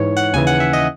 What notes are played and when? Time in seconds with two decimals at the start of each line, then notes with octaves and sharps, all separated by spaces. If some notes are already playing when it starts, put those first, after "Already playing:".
Already playing: G#2 E3 C#5
0.17 F#5
0.33 D#2 C#3 E3 G#5
0.47 F#5
0.60 E5
0.73 D#5